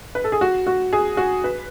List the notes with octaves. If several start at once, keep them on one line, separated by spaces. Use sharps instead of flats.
B4
A4
G#4
F#4
F#4
G#4
F#4
B4